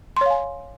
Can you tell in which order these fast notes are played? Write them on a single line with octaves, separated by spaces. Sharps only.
C6 C#5 F5 G#5